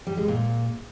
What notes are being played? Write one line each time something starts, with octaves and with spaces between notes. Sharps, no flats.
G3
G#3
A#2